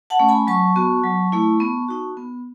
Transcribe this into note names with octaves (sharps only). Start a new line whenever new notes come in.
F#5 A5
A3 C#4
G#5 B5
F#3 A5 C#6
B3 F#4
F#3
A3 E4
B3
D#4 F#4
B3